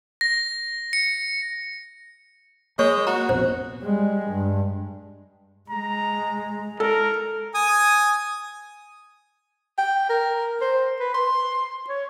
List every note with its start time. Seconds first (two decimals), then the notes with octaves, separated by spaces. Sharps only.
0.21 A#6
0.93 C#7
2.79 G#3 A#3 C#5 C#6
3.07 F#4 A#5
3.29 A#1 F2 B2 C5
3.83 G3 G#3
4.28 G2
5.70 G#3 A#5
6.80 A4 A#4
7.55 G#5 D#6
9.78 G5
10.09 A#4
10.62 C5
11.00 B4
11.14 C6
11.89 C#5